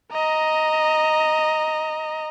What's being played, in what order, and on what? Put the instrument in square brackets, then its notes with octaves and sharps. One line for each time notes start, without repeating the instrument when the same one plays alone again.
[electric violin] D#5 A#5